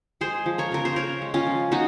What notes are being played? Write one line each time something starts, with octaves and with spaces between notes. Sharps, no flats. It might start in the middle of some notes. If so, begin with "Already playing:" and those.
G#3 G#4 C5
F3
A#4 C#5
C#3 A#4
C5
C#3 A#4 C#5
G#3
C#4 F4
F3
G#3 D#4 F#4